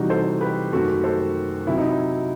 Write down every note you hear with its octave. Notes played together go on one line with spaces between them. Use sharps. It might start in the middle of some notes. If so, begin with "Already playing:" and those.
Already playing: C3 E3 G3 D#4 F#4
A4 C5
G4 B4
F#2 D#3 A3 F#4 A4
A4 C5
C3 F#3 C4 E4
D#4
E4